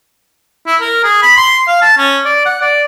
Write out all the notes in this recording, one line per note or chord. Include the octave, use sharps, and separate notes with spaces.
E4
A#4
G#4
B5
C6
F5
A5
C#4
D5
F#5
D5